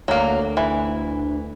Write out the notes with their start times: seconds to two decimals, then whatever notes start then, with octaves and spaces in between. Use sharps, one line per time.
0.08 D2 F#3 A#3
0.57 E3